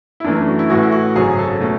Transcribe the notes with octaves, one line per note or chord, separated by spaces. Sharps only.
E4
F#2 E3 A3 D4
D4
F#4
E4
A1 A2 E3 F#4
E4
F#4
G#1 F#2 C#3 F#3 G#4
A4
B2 A3